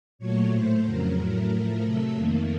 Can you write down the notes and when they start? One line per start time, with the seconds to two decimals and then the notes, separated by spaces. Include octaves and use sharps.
0.19 A#2 F#3 A3 C#5
0.51 A2 A3 C5
0.84 F2 C#3 F#3 A#4
1.18 A2 F#3 A3
1.50 A2 F3 A3 A#4
1.83 C3 F#3 A3 A4
2.15 F2 D#3 A3 A#3